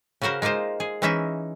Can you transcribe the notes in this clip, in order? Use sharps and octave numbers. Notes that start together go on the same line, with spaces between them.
C#3 C#4 F#4 A#4 C5
G#3 A#3 D#4 F4 C5
G#4
E3 G#3 C#4 D#4 E4 E5